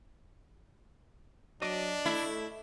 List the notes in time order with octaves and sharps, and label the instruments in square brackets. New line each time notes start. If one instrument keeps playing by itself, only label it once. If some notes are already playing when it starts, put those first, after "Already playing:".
[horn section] F#3 [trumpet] D4 [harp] D#5 D6 D7
[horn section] A3 [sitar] E4